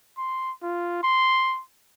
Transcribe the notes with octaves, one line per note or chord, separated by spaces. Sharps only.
C6
F4
C6